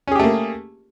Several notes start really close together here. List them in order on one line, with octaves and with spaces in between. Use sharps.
C#4 G#4 G4 A3 A#3